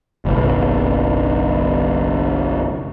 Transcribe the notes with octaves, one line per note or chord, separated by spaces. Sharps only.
F#1 B1